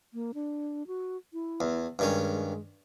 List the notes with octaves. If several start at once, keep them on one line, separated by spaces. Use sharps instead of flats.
A#3
D4
F#4
E4
E2
G2 D#3 G#3 C#4